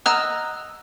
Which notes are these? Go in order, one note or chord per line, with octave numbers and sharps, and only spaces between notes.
D#5 F#5 A#5 E6 F6